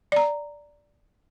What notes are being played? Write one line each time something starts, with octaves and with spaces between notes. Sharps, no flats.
D5 A#5